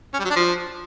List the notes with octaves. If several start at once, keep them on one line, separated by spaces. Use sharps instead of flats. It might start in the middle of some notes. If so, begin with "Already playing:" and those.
C#4
G3
F#3
D4
F3